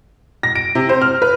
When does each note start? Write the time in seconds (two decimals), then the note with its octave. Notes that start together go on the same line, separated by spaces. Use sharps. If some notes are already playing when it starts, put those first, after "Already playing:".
0.43 A#6
0.55 D7
0.75 C3
0.89 C5
1.01 F6
1.22 B4